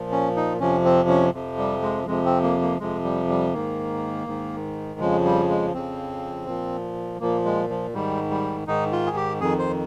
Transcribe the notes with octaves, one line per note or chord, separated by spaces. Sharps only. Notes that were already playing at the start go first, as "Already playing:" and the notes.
Already playing: A#2 F3
C#4
D#4
F2 C3 F3 C#4
C4
C#4
F2 C3 F3
G3
G#3
F2 C3 F3 G#3
C4
A#3
A#3
F2 C3 F3 G#3
G3
G3
G#2 D#3 A#3
G#2 D#3
F2 C#3 F3 G#3
G3
G#3
F2 C#3 F3 C4
A#2 F3
A#2 F3 A#3
G#3
F3
G#2 D#3 G3
G3
G#2 D#3 D#4
F4
G#4
G4
F2 D#3 G#4
C5